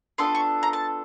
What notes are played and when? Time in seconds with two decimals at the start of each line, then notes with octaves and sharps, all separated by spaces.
0.18 B3 D4 F4 A4 C6
0.35 C#6
0.63 A#5
0.73 A5